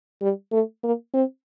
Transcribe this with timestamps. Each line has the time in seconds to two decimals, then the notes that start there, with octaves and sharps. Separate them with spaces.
0.22 G3
0.52 A3
0.84 A#3
1.14 C4